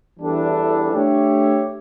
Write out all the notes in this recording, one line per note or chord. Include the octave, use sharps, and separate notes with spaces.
E2 E3 G3 D4 A4
A3 D4 G4 C#5 E5